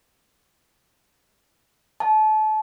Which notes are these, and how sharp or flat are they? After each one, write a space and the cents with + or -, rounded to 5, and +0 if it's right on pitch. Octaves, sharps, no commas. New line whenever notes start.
A5 -30